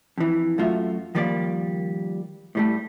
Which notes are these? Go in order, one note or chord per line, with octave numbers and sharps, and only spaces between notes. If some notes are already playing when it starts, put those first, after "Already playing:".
F2 E3
F#2 A3 F4 F#4 E5
D#3 F3 G3 A#3 D5 F5
A2 G3 A3